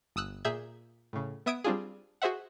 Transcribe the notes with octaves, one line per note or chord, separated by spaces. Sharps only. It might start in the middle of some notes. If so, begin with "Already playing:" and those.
G1 D#6 E6 F#6
A#2 G#4 E5 G6 G#6
A2 C#3
B3 E5 D#6 G#6 D7
G3 C4 D4 F4 G#4
F#4 G#4 C5 E5 F#5